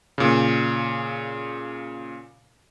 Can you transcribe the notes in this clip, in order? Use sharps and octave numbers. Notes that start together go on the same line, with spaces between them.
A#2 C#3